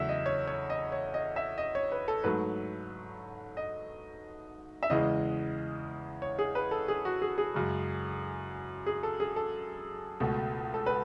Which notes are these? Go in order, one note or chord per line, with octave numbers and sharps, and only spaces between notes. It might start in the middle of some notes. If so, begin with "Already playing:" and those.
Already playing: E2 C#3 F#3 A3 E5
D#5
C#5
C#5
D#5
C#5
D#5
E5
D#5
C#5
B4
A4
G#2 F#3 A3 B4
D#5
E5
E2 C#3 E3 G#3 D#5
C#5
G#4
B4
A4
G#4
F#4
G#4
G#4
F#2 C#3 G#3
G#4
A4
G#4
A4
C#2 B2 A3
A4
B4